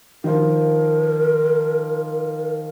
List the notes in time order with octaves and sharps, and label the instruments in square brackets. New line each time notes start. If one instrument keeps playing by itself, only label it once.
[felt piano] D#3 F3 [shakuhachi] A#4